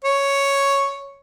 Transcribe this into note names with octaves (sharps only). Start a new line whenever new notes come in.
C#5